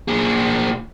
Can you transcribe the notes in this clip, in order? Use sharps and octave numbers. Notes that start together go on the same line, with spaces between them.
A#2 G#4